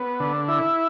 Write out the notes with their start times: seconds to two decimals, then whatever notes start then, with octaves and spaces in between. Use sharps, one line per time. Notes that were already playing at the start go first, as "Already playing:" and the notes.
Already playing: B3
0.20 D3
0.48 E4